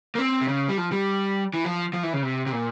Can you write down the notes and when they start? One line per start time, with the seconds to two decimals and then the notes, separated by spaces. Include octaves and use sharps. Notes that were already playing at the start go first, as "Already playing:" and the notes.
0.15 A#3
0.19 C4
0.41 C3
0.48 C#3
0.69 G3
0.78 F3
0.92 G3
1.54 E3
1.65 F3
1.93 F3
2.03 E3
2.13 C#3
2.22 C3
2.46 C3
2.52 A#2